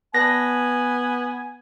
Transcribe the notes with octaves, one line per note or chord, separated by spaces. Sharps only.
B3 B4 D5 G#5 A5 A#6